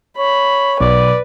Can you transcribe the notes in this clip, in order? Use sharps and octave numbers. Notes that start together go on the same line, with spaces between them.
C#5 B5
B1 B4 D5